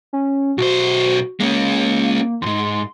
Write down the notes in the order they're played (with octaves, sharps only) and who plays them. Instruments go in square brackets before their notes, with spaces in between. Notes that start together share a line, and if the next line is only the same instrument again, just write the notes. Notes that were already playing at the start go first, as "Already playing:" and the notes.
[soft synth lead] C#4
[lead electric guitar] B1 C5 [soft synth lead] F#4
[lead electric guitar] G#3 C#4 [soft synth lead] A#3
[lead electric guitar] E2 G#2 [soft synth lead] C6